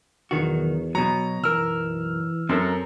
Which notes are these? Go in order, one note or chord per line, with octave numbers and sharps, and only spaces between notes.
B1 E2 D#3 F#4
B2 F#3 A#5
B1 F#2 E3 A#4 E6 F6
F#2 C4 A4 A#4